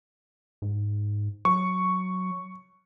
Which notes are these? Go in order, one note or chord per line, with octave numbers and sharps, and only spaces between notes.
G#2
F#3 C#6